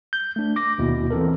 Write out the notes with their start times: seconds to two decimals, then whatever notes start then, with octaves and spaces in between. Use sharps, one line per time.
0.13 G6
0.36 A3 D4
0.56 D6 A#6
0.78 D#2 B2 E4
1.11 E3 C4 A4 A#4